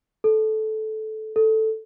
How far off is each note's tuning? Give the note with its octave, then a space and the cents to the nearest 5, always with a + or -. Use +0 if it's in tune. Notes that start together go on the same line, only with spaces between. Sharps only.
A4 -15
A4 +0